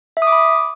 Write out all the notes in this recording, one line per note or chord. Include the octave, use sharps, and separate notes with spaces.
E5
D#6
D6
B5